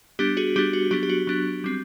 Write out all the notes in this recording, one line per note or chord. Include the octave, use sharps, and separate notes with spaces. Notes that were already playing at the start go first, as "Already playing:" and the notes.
G3 B3 D4 G4
F#4 G#4
G3 B3 D4 G4
F#4
F#3 B3 D4 G4
G4
F#4
F#3 B3 D4
G3 C4